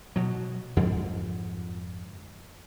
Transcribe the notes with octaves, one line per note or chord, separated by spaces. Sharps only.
B2 F#3
F2 G#2 D3 F3